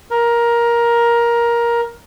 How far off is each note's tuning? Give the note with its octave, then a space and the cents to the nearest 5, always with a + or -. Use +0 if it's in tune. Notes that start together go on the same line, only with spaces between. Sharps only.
A#4 +15